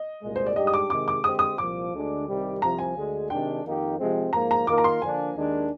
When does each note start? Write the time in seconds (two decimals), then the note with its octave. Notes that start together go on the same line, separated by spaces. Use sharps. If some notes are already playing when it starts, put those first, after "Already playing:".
Already playing: D#5
0.22 C2 A#2 G#3
0.36 C5
0.46 D5
0.56 G#2 G3 D4 G4 D#5
0.67 D#6
0.74 D6
0.90 C3 D#3 G#3 D6
1.08 D6
1.24 D3 G#3 C4 G4 C5 D#6
1.39 D#6
1.58 C2 A#2 F3 D6
1.93 D2 D3 G#3 D4
2.28 C2 C3 D#3 G3
2.62 C2 C3 F3 A#5
2.79 G#5
2.95 D2 D3 G#3
3.30 C3 D#3 G#3 D4 G5
3.65 F2 D#3 A#3 D#4 G4
3.99 C3 F3 G#3 C4
4.33 G#2 F3 A#3 A#5
4.51 A#5
4.67 D#3 A#3 F4 A#4 D6
4.78 A#5
4.84 C6
5.02 D3 F3 A#3 D4 G#5
5.36 D#2 D#3 G#3 D4